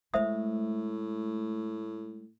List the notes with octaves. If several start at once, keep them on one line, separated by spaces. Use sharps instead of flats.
A2 G#3 A3 C5 E5 D#6